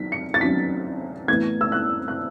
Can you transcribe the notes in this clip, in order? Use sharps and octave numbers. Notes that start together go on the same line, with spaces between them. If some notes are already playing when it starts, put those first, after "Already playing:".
Already playing: D#3 F#3 B6
C#7
A6
D#3 F#3 C#4 B6
A2 E3 B3 G#6
E6
F#6
F#6